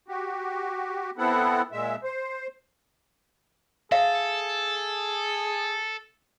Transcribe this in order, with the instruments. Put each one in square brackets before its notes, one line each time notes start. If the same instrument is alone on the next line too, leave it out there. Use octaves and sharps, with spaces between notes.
[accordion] F#4 G4
B3 C4 E4 A4 F#5
A#2 G#3 E5
C5
[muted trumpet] G#4 [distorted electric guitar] A4 [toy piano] E5 F5